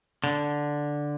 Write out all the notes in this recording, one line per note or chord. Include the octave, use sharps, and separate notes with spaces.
D3